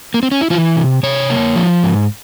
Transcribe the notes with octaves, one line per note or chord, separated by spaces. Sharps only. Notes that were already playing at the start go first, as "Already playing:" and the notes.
A#3
C4
C#4
E4
E3 F4
C3
C3 C#5
A#3
F3
G#2